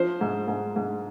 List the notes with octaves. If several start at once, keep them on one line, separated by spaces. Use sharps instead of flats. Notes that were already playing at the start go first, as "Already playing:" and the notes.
Already playing: F3 C5
G#2
G#2
G#2